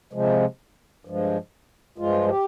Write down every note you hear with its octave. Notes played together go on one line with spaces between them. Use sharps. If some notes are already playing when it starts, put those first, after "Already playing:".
C3 F3 G#3
G2 F3 G#3
G2 F3 G#3 F4
G4